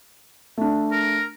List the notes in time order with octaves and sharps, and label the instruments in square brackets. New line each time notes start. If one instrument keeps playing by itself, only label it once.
[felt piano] A3 D4
[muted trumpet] A#4